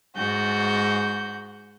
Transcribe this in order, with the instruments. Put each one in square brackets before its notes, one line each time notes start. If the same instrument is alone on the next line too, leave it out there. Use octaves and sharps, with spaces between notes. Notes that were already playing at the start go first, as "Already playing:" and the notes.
[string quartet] G#2 F#4 G6